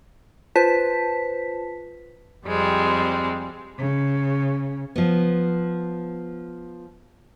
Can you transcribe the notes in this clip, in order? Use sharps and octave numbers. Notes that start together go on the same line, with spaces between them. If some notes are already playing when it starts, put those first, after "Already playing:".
F4 B4 C5 A5 B6
F2 G3 G#3 C4
C#3
F3 B3